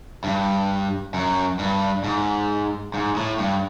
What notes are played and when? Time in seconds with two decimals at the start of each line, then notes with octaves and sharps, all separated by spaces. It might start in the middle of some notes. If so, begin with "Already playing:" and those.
0.24 G2
1.14 F#2
1.59 G2
2.04 G#2
2.94 G#2
3.16 A2
3.38 G2